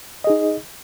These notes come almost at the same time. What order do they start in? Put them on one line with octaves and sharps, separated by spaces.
D#5 G#4 D#4